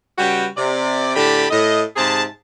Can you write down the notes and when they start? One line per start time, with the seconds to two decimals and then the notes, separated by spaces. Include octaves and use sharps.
0.19 C#3 G3 F#4 B4 G5
0.57 C3 D5
1.15 A2 D3 G4 A5 B5
1.50 A2 D#5
1.97 G#2 C3 G#4 A5